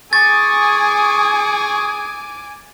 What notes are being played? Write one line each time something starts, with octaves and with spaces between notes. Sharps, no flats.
G#4 G#5 C#6 D6 A6